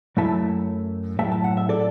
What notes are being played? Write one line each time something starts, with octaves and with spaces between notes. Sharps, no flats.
F#2 F#3 A3 E4 E5 A5
A2 F#3 A3 E5 A5
A5
F#5
E5
A4 D5